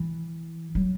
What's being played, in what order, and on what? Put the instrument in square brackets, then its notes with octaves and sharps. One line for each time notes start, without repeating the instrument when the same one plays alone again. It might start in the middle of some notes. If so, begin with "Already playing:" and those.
Already playing: [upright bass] E3
F#3